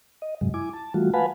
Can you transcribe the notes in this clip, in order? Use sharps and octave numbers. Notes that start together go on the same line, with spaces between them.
D#5
G2 C3 F#3 G#3
E4 G#5 D6
A5
E3 G3 A3 F4 F#4
B4 F5 F#5 G#5 A5 B5